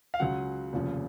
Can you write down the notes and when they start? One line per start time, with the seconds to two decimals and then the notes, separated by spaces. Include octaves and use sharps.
0.14 F5
0.20 C#2 C#3 F#3 F#5
0.73 F1 D#2 C#3 F3